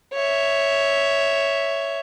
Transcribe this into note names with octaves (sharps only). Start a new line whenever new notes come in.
C#5 E5